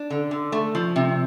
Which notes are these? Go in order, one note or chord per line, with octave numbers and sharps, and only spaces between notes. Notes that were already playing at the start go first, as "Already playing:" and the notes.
Already playing: D4
D3
D3
A3
F3
C3